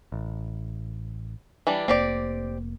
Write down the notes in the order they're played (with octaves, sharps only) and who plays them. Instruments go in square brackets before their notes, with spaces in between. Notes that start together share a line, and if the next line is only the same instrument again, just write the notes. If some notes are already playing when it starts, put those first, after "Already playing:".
[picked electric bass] A1
[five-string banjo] E3 G3 D4
[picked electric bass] F1 A#3 [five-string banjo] C4 G4 D5